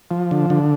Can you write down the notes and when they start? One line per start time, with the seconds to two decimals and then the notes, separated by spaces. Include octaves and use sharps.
0.11 F3
0.31 D3
0.50 D3